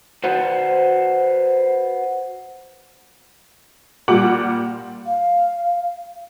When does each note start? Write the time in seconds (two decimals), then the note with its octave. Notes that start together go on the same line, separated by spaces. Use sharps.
0.24 F#4 B4 C5 F#5
4.08 A#2 G3 F#5 D6 F#7
5.06 F5